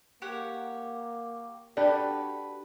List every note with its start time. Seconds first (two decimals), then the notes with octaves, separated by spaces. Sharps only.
0.22 A#3 G4 C#5 F#5
1.77 D4 F#4 G4 A4 B4 D5